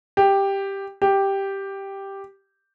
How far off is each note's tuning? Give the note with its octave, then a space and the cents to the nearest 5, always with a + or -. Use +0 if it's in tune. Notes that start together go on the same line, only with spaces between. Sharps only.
G4 +5
G4 +0